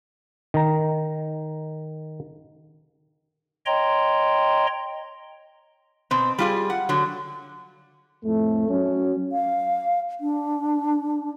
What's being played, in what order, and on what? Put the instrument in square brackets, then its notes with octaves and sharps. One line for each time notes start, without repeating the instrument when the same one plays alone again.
[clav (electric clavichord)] D#3 A#5
[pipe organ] C#5 D#5 G5 A#5 C6
[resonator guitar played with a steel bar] B2 C4
G3 F4 G#4
F#5
D3 F#3
[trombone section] F2 A2 A3
F#3 C#4
[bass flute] F5
D4